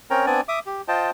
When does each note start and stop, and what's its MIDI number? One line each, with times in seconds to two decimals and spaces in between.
0.10 0.26 60
0.10 0.26 61
0.10 0.26 70
0.10 0.26 73
0.10 0.26 79
0.10 0.26 82
0.26 0.41 59
0.26 0.41 60
0.26 0.41 62
0.26 0.41 74
0.26 0.41 80
0.48 0.59 76
0.48 0.59 86
0.48 0.59 87
0.66 0.82 67
0.88 1.11 65
0.88 1.11 72
0.88 1.11 75
0.88 1.11 79
0.88 1.11 81